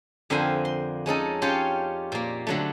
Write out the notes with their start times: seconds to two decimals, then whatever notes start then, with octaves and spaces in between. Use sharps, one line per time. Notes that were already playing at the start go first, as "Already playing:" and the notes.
0.30 F2 D3 A#4 C5 F5 G#5
0.65 C6
1.06 G#3 C#4 D#4 A4
1.42 C#4 F4 G4 C#5 F5 G5
2.12 A#2 A#3
2.47 D3 F#3 A3